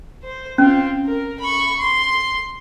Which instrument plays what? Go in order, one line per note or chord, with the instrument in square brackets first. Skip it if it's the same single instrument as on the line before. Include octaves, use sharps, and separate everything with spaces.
[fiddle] C5
[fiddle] C4 F4 [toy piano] C#4
[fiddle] A#4
B5 C#6
C6